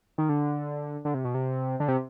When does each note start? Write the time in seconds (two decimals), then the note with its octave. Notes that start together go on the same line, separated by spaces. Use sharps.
0.18 D#3
0.29 D3
1.05 D3
1.14 C3
1.25 B2
1.34 C3
1.80 D3
1.88 C3